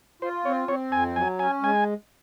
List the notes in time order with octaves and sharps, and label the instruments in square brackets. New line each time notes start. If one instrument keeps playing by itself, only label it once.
[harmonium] F4 [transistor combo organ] C5
[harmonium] C4 [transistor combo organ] C#5
[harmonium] C4 [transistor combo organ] C#5
[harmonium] F2 [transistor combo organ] G#5
[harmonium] F#3 [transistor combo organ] G#5
[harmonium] C#4 [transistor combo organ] G#5
[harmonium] G#3 [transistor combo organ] G#5